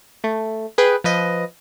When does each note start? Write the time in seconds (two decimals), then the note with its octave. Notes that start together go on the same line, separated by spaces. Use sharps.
0.24 A3
0.78 G#4 B4 G5
1.04 F3 B4 D#5